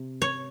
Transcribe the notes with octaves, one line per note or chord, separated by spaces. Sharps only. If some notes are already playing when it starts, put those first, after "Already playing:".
Already playing: C3
C#5